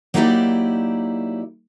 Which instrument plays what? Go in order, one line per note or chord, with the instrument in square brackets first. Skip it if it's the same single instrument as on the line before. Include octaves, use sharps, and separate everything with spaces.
[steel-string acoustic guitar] F#3 A#3 D#4 E4 G4 D5